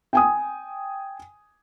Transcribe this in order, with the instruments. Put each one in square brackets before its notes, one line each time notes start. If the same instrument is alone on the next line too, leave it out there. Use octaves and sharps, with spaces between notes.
[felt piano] G5 G#5 D#6